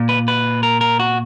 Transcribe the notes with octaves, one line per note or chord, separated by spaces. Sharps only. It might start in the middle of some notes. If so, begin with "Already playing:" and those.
Already playing: A#2
B4
B4
A#4
A#4
F#4